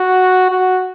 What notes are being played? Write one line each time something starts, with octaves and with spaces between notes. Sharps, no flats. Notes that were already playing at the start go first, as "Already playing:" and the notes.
Already playing: F#4
F#4